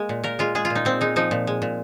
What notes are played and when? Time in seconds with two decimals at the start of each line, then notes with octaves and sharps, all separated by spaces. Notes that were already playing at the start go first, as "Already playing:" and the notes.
Already playing: G#3 A#3
0.09 A#2
0.24 A#2 A#4
0.39 G#3 F4
0.55 G#3 G#4
0.65 F4
0.70 A#2
0.75 D#4
0.85 A#2 C4
1.01 G#3 D#4
1.16 F3 D#4
1.31 A#2
1.47 G#3
1.62 A#2